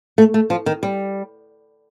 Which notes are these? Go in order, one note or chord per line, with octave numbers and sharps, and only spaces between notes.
A3
A3
F3
D#3
G3